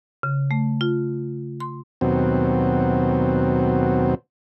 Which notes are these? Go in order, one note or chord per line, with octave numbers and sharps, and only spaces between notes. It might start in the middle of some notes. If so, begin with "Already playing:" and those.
C#3
A3
F4
C6
D#2 B2 F#3 C4